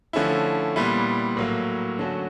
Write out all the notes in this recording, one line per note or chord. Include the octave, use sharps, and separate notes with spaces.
D3 F3 A3 C#4 E4
A#2 G3 B3 E4
A2 F#3 A#3
D3 F#3 A3 C#4 F#4